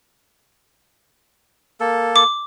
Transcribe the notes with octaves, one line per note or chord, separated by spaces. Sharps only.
A#3 A4
D6